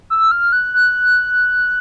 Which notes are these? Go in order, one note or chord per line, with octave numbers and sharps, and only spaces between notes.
E6
F6
F#6
F#6